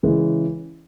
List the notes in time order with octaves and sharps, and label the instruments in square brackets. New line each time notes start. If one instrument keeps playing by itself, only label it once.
[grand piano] C#3 E3 G#3 C#4